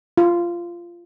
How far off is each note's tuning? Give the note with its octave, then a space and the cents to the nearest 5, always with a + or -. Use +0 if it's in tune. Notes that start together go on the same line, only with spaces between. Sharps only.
F4 -15